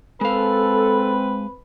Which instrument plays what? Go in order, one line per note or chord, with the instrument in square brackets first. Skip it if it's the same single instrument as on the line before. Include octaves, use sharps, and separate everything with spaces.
[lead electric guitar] G#3 F5 [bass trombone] C4 [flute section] A4 [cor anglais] B4